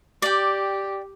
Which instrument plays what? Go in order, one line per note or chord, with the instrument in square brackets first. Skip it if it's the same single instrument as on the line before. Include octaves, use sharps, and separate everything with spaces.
[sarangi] G4 [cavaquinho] D5 G5